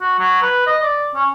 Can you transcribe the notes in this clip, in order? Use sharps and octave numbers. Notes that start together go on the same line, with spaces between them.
F#4
F#3
B4
D#5
D5
C#4